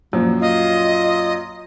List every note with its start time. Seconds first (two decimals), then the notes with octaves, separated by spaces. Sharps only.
0.13 F#2 A#2 F3 F#3
0.42 F4 D#5